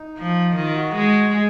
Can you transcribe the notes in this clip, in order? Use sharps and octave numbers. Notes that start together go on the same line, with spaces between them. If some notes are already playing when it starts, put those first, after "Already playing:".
Already playing: D#4
F3
D#3 F4
F#4
G#3
G#4